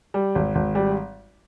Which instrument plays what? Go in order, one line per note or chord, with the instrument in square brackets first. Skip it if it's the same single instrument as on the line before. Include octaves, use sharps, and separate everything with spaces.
[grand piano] G3
G#1
G#1
G3